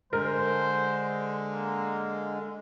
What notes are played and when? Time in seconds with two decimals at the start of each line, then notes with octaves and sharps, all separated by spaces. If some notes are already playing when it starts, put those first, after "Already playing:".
0.13 D3 G#3 A#4 C5
1.50 A#3